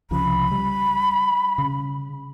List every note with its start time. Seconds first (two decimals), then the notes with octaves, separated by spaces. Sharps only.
0.11 C2 C#3 F3 B5
0.51 G3
1.58 C#3